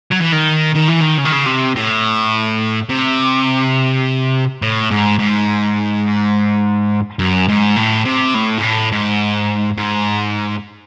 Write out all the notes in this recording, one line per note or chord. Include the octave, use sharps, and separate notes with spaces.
F#3
E3
D#3
D#3
E3
D#3
C#3
D#3
C#3
C3
A2
C3
A2
G#2
G#2
F#2
G#2
A2
C3
A2
G#2
A2
G#2
G#2